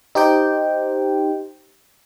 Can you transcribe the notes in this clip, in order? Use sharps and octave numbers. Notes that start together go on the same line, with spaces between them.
D#4 G4 C5 G5